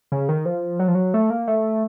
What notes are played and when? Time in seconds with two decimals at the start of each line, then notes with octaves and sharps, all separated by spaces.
0.12 C#3
0.29 D#3
0.46 F3
0.79 F#3
0.88 F3
0.95 F#3
1.14 A3
1.30 A#3
1.48 A3